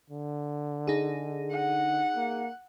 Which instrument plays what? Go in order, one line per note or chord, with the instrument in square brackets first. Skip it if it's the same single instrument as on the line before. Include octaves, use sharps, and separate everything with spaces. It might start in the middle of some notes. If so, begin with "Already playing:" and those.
[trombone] D3
[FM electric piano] D#4 G#4
[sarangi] F#5
[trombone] A#3